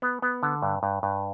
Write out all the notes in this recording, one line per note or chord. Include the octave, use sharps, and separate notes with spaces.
B3
B3
D3
G2
G2
G2